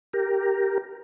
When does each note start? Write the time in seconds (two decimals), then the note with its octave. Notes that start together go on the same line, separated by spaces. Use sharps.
0.13 G4 A#4